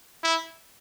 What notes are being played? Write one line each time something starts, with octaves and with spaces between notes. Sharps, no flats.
E4